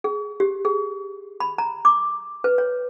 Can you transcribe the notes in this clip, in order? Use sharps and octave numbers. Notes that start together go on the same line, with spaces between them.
G#4
G4
G#4
B5
A#5
D6
B4
C#5